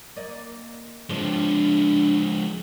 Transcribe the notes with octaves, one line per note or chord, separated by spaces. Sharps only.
A#3 D5 D#5
F3 G#3 C4 D4 B4